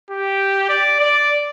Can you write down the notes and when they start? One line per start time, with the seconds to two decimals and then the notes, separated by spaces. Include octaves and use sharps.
0.11 G4
0.69 D5
1.00 D5